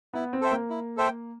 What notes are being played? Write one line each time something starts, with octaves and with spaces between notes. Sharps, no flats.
B3 E4
C4
A4 C5 E5 G5
A#3
E4
A4 C5 E5 G5